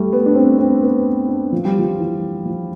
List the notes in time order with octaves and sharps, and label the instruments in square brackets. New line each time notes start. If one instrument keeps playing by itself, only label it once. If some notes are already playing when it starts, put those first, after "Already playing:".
Already playing: [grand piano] G3 A3
B3
D4
C4
C4
B3
D4
F3
G3
F3
E3
F3